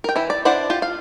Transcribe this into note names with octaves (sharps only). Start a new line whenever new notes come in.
A#4 G5
E3 E4
D5
D4 E4 C5 D5 F#5
F4 G4
F5